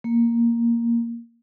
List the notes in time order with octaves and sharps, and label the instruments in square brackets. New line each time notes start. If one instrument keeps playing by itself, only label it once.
[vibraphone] A#3